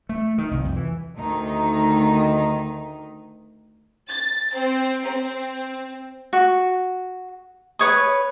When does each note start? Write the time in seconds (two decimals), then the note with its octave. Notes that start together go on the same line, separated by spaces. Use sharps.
0.09 A3
0.38 D#3
0.51 C2
0.64 F2
0.76 E3
1.16 D2 D#3 A3 D#4
4.07 A6
4.54 C4
5.04 C4
6.33 F#4
7.79 B4 C#5 D#6